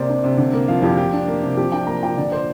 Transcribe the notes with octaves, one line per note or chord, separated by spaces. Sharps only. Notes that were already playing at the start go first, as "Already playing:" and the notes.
Already playing: C3 A#3 C5 D5
D4
C3
D3
A#3
F3 F5
F2 G4
F3 G4
D4
A#3
C3
F3 G4
D4 G5
A#3 A#5
A#2 G5
D3 D5
C5